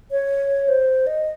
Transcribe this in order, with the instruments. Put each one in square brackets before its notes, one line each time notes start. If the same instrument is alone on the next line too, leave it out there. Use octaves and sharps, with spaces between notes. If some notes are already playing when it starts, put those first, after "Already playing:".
[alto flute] C#5
C5
D#5